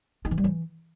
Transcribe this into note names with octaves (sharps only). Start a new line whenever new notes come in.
D#4
E3
G3
E3